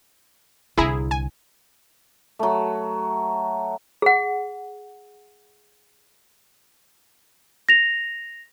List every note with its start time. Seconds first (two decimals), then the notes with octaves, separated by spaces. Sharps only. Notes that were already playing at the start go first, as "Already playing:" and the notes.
0.78 C2 D3 E4 G#4 A#5
1.11 G#5
2.39 F#3 A3
4.02 G#4 F#5
7.69 A#6 F7